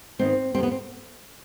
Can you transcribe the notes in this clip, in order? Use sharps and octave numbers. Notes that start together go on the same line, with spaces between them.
G#2 D#3 B3 C4
F2 D3 G3 C4
B3
C4